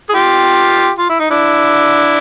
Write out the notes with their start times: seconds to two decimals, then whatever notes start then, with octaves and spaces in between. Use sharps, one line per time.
0.09 G#4
0.13 F4 G4
0.98 F4
1.09 E4
1.20 D#4
1.30 D4 E4